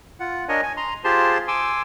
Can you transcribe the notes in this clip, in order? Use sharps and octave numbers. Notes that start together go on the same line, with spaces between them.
F4 F#5
D4 A#4 C#5 D#5 G#5
G#5
A#5 C6
F4 G4 G#4 C5 A5 C6
G#5 C6 D6 E6